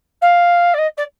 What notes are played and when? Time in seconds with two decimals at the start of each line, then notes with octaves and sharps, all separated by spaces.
0.21 F5
0.74 D5
0.78 D#5
0.97 D5